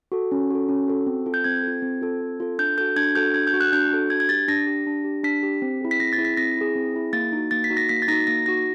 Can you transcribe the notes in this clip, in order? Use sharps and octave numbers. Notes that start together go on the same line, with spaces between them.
F#4 A4
C#4
F#4 A4
C#4
F#4 A4
C4
F4 A4
G6
C4 G#6
F4 A4
C4
F4 A4
C4
F4 A4
D4 G6
F#4 A4 G6
D4 G#6
F#4 A4 G6
D4 G#6
G6
F#4 A4
F#6
D4 G6
F#4 A4
D4 G#6
G#6
G4 A6
D4 A#6
G4
D4
G4
D4 B6
G4
C4
E4 G#4
B6
C4 A#6
A6
E4 G#4
B6
C4 A#6
E4 G#4
C4
E4 G#4
A#3 A6
D#4 F#4
A#3 A6
B6
D#4 F#4
A#6
A#3 B6
A6
D#4 F#4 A#6
A#3 A#6
D#4 F#4 A#6